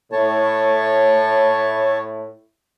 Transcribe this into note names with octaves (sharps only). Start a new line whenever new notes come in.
A2 C#5 A5